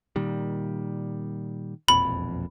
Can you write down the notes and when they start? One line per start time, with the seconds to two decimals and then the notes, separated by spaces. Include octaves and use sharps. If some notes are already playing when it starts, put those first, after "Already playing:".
0.16 A#2 D#3 G3
1.88 E1 A#1 F2 B5